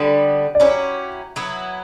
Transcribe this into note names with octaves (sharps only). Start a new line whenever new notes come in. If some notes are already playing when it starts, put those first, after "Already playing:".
Already playing: D3 G3 B3
D5
F#3 C#4 E4 G4 C#5
F#3 B3 E4